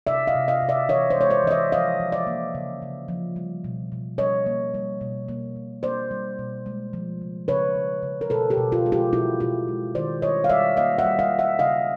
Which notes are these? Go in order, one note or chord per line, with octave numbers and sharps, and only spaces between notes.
C3 D5 E5
D#5 F5
C3
D#5 F5
C3
D5 E5
E3 C#5 D#5
C5 D5
G#3 C#5
C5 D5
E3 D#5
D5 E5
F3 D#5 F5
F3
D5 E5
A#3
C#3
C#3
F3
G3
B2
B2
G3 C#5 D#5
A#3
G3
B2
A#3
B2
A#3 C5 D5
G3
B2
G#3
F3
C#3
C#3 B4 C#5
C#3
C#3
A#4
B2 A4 B4
G4 A4
B2
F4 G4
G#3 G#4
F4 G4
B2 E4 F#4
B2 F4 G4
G#3
D#3 C5 D5
G3 C#5 D#5
F5
G3 D5 E5
A#3 D#5 F5
E5 F#5
G3
D#5 F5
G3
E5 F#5
C#3 D#5 F5